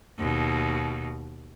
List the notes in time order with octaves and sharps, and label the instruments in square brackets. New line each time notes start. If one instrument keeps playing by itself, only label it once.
[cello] D#2 B2